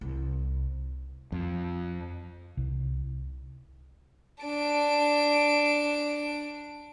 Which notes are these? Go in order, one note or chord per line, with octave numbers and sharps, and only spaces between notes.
C2
F2
C2
D4 D7